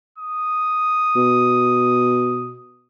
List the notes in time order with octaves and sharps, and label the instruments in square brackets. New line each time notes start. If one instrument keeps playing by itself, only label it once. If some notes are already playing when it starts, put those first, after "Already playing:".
[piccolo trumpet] D#6
[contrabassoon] B2